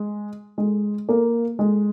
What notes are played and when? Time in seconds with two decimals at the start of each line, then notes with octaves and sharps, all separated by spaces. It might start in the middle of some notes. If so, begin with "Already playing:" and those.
Already playing: G#3
0.58 G#3
1.09 A#3
1.59 G#3